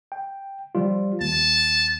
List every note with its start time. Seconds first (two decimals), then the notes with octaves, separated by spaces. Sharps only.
0.12 G5
0.75 F3 G3 F4
1.21 D#2 A5